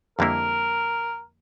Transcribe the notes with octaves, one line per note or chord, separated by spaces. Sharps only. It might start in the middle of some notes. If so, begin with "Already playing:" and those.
F2 D3 G3 A#3 E4 A#4